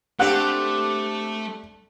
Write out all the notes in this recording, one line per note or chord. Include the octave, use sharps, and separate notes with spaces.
A3 C4 D4 G4 A4 F#5 F#6